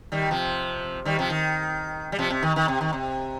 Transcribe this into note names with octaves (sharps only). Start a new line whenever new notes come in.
D#3 G3
C3 F3
D#3 G3
C3 F3
D#3
G3
C3 F3
C3
D#3
D#3
C3
D#3
C3